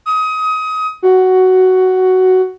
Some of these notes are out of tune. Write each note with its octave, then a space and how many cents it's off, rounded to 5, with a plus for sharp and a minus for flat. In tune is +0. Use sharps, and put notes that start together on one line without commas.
D#6 +25
F#4 +10